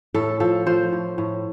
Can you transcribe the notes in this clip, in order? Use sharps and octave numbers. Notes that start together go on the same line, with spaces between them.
A2 A4
F3 A4
F3 C5
A2
A2